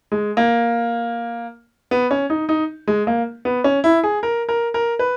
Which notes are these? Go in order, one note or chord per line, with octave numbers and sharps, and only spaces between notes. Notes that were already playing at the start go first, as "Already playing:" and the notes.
G#3
A#3
B3
C#4
D#4
D#4
G#3
A#3
B3
C#4
E4
G#4
A#4
A#4
A#4
B4